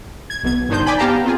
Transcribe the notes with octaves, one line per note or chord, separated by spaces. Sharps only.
G#6
B1 B2 G#6
G1 D#3 D4 D#4 C5 G6
D5 G5 G#5 B5
B3 G4 F5 G5 A5 A#5
C4 F4 G#4